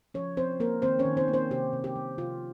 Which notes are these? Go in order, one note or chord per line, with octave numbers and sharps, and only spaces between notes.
F3 C#4 C#5
F3 C4 C5
A#3 A#4
D#3 C4 C5
C#4 C#5
D#3
C4 C5
A#3
C4 C5
C3 G4
C3
G4
G3
C3 F4